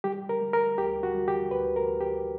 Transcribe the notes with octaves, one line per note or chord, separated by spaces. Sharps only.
G3 G4
A#4
G3
A#4
D2 G4
F#4
G3
G4
D2 B4
A#4
D2
G4